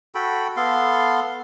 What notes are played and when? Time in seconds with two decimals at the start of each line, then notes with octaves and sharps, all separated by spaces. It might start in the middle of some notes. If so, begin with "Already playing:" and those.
0.15 F#4 A4 G5 B5
0.57 B3 A4 F5 C6